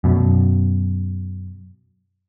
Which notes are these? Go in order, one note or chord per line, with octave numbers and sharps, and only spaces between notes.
F#2 B2